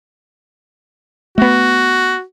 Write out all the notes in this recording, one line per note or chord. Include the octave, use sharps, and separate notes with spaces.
A3 B3 F#4